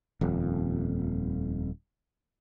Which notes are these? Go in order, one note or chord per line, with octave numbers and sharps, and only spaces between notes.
D#1 F2